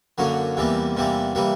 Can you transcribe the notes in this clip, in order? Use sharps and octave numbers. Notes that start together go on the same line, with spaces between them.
F#2 D3 F#3 A#3 C#4
E2 C3 E3 G3 A#3
E2 C3 E3 G3 A#3
C3 E3 G3 A#3